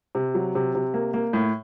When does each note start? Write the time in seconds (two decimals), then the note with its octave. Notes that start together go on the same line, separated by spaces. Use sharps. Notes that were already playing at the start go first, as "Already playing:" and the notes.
0.15 C3
0.34 F#3
0.55 C3
0.75 C3
0.94 A#3
1.14 A#3
1.33 A2